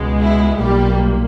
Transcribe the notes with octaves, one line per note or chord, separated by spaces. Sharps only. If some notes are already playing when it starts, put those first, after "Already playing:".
Already playing: C#2 B2 G#3
E4
B1 A#2 G3 A#3 G4